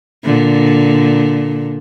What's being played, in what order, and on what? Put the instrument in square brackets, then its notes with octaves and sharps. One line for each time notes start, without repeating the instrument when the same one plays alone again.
[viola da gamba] A#2 D3